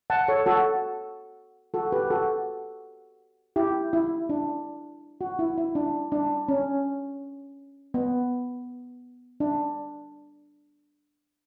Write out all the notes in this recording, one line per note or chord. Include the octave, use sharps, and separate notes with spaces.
F#5 A5
A4 C#5
F#4 A4
F#4 A4
G4 B4
F#4 A4
E4 G4
E4
D4
F#4
E4
E4
D4
D4
C#4
B3
D4